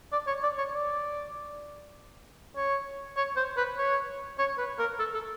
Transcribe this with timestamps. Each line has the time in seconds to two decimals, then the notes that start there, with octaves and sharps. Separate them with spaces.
0.12 D5
0.27 C#5
0.43 D5
0.58 C#5
0.74 D5
2.57 C#5
3.17 C#5
3.37 C5
3.57 B4
3.78 C#5
4.39 C#5
4.58 B4
4.79 A#4
4.99 A4
5.14 A4